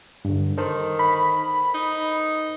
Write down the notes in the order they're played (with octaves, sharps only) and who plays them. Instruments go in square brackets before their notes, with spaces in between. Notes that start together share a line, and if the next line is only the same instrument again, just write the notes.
[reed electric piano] G2 D3
[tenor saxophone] D#3 [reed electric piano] A4 A#4 C5
[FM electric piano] B5
[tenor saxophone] D#4